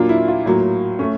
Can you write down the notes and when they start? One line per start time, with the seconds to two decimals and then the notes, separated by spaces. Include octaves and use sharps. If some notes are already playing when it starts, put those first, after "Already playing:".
Already playing: A#2 F#3 A#3 D4 F4
0.09 E4
0.28 F4
0.46 A2 F#3 A#3
0.99 A3 C#4